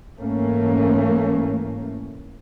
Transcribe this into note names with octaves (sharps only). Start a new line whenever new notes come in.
G#2 E3 A3 A#3 C#4